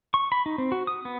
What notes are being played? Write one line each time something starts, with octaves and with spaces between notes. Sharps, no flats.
C#6
B5
D#4
C4
F#4
D#6
B3